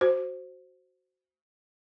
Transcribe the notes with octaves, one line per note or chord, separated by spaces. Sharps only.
F#4 C5